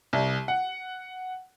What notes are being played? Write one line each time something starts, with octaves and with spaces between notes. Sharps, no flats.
C2
F#5